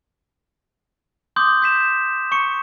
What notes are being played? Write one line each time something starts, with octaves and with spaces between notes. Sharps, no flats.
C6 D6 D#6 G6
G6 B6 E7
C#6 C#7